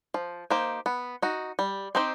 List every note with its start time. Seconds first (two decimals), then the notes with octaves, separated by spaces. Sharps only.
0.14 F3
0.50 A#3 D#4 G4 C5
0.86 B3
1.22 D#4 F#4
1.59 G3
1.95 C4 D#4 G4 C5